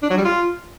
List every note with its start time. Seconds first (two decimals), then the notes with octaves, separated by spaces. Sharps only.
0.03 D4
0.10 F#3
0.17 G3
0.25 F4